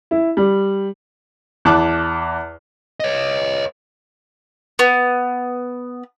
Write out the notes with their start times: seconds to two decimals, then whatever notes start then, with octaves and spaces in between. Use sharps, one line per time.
0.11 E4
0.37 G3
1.65 E2 A5 D6 F#6
3.00 C#5 D#5
4.79 B3